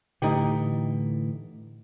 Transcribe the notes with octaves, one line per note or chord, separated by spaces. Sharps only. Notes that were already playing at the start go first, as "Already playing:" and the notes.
A2 D3 E3 D#4 G4